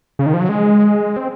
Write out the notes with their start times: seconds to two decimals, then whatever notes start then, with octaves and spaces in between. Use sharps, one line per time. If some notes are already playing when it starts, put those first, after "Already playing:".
0.19 C#3
0.26 D#3
0.34 F3
0.41 F#3
0.49 G#3
1.17 C4